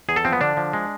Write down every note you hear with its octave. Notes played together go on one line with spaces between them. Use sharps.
E2 G#4
A4
F3 C4
B3
D3 D4
F3
G#3